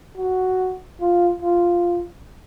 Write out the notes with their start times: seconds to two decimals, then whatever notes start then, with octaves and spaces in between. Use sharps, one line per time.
0.17 F#4
1.00 F4
1.42 F4